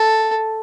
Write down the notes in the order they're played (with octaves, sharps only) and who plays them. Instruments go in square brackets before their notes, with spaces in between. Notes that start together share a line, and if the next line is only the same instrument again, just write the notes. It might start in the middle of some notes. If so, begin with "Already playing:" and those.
Already playing: [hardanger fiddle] A4